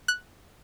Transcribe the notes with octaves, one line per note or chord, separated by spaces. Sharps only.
F#6